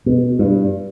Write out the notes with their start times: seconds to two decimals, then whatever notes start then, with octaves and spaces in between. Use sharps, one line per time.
0.06 B2
0.39 G2